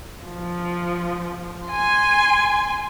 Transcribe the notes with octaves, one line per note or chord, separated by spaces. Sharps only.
F3
G#5 C6